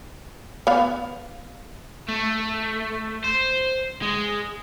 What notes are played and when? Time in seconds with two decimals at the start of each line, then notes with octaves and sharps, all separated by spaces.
0.67 B3 F5
2.08 A3
3.24 C5
4.02 G#3